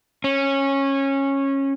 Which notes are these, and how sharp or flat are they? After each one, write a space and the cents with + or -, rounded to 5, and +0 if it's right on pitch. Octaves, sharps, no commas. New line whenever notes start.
C#4 -15